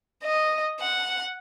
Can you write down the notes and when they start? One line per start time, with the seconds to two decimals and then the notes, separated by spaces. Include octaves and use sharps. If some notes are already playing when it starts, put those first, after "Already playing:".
0.24 D#5
0.80 F#5